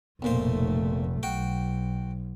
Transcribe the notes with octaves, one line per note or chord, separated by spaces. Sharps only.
F1 B1 A#2 A3 C5
B1 F#4 G5